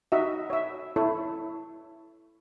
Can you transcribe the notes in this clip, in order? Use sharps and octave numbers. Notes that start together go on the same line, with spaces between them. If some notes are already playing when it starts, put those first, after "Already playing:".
D#4 F#4 D#5 E5
C#5 E5
E4 A4 C#5